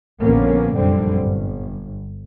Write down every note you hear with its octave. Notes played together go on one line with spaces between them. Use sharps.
A#1 D3 F3 A#3 B3 C#4
F1 A#1 F#2 D3 G3 C4
G1